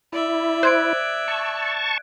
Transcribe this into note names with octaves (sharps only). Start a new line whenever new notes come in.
E4 D5 E5
C5 F#6 G#6 D7
A5 C#6